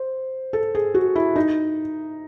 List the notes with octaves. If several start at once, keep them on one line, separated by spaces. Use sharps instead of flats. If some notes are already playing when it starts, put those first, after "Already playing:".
Already playing: C5
A4
G#4
F#4
E4
D#4